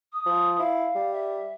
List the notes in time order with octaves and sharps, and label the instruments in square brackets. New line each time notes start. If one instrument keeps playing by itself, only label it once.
[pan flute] D#6
[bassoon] F3
[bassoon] E4 [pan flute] F5
[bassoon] G3
[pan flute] E5